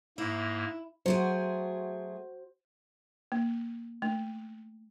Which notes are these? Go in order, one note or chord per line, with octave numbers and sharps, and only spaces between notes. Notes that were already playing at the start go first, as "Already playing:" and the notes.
G#2 A#3 E4
F#3 A3 F#4 G#4 C5
A#3
A3